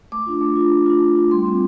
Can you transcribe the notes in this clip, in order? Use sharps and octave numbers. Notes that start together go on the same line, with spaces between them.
A3 D6
D4 F4
A3
D4 F4
A3
D4 F4
A3
D4 F4
G3 C6
C4 F4